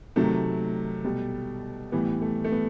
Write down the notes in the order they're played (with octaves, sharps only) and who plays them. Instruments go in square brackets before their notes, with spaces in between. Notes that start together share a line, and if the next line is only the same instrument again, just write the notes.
[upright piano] C3 D#3 F#3 A3
B2 G3
A2 E3 G3 B3
A3
A3
B3